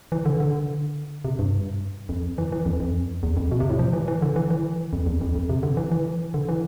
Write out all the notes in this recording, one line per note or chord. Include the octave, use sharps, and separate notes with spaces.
E3
D3
D3
C3
G2
F2
E3
E3
F2
F2
E2
F2
B2
C3
A2
F3
E3
E3
D3
E3
E3
F2
E2
F2
F2
C3
D3
E3
E3
D3
E3